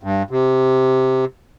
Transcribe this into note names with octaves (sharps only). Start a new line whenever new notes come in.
G2
C3